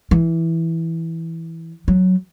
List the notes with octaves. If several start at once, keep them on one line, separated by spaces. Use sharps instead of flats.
E3
F#3